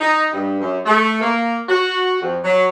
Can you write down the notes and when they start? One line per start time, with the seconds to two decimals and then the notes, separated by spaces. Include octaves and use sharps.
0.01 D#4
0.32 G2
0.61 F#2
0.86 A3
1.22 A#3
1.69 F#4
2.22 F2
2.44 F#3